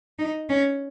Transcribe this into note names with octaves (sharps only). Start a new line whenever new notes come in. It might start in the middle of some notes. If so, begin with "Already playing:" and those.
D#4
C#4